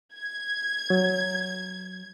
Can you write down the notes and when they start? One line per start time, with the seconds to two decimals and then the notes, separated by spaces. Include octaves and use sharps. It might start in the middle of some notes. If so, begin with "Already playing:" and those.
0.14 G#6
0.90 F#3